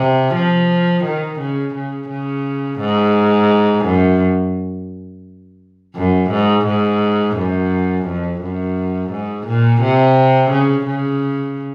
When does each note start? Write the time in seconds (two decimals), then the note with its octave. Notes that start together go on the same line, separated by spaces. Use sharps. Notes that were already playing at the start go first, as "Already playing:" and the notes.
Already playing: C3
0.35 F3
1.04 D#3
1.40 C#3
1.75 C#3
2.09 C#3
2.80 G#2
3.86 F#2
5.96 F#2
6.31 G#2
6.66 G#2
7.37 F#2
8.07 F2
8.41 F#2
9.11 G#2
9.47 A#2
9.82 C3
10.51 C#3
10.86 C#3